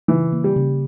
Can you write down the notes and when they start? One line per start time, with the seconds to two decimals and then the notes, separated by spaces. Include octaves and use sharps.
0.08 C#3 E3
0.33 A#3
0.44 G3
0.56 C#3